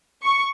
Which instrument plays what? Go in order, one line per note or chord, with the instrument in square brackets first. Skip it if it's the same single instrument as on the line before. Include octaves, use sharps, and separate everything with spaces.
[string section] C#6